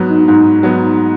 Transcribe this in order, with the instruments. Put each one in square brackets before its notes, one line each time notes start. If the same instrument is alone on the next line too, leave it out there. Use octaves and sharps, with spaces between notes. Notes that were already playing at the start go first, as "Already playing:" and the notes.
Already playing: [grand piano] G#2 F#3 B3
[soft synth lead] D#4
[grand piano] G#2 [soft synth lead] D#4
[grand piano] F#3 B3